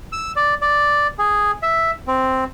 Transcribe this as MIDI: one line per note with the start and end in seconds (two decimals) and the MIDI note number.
0.12 0.32 88
0.36 0.54 74
0.61 1.07 74
1.19 1.51 68
1.63 1.91 76
2.07 2.44 60